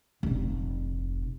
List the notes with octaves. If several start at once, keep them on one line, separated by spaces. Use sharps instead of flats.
F1 A#1